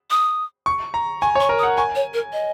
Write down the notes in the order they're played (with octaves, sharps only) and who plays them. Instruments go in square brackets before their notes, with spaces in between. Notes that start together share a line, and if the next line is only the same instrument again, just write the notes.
[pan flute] D#6
[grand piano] C#6
A#5
[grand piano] G#5 [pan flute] C#6
[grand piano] C#5
[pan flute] C#6
[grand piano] A#4
[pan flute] D#6
[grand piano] F#5
[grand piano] G#5 [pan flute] C#6
[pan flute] C#5
A#4
D#5